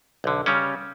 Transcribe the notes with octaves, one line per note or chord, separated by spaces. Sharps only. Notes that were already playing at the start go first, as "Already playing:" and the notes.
B1 D3
C#3 G3 C#4